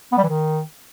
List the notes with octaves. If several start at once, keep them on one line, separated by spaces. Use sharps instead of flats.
B3
G3
E3
D#3